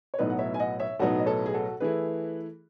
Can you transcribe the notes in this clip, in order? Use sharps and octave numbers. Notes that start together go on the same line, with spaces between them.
C#5
B1 A2 F#3 B3 D#4 B4 D#5
F#5
C#5 E5
G#5
D#5 F#5
C#5 E5
B1 A2 F#3 B3 D#4 F#4 A4
D#5
A4 C#5
G#4
F#4 A4
E3 A3 E4 G#4 B4